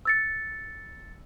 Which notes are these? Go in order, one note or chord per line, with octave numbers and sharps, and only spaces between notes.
E6 A6 C#7